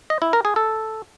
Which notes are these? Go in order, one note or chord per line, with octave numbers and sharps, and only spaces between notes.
D#5
E4
A#4
G#4
A4